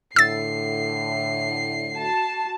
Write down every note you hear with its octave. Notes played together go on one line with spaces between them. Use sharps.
A2 D3 E6 A6 C7
F#4 A5